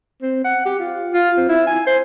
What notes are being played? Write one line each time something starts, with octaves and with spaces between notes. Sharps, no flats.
C4
F#5
G4
F4
F4
C4
E4
G#5
C5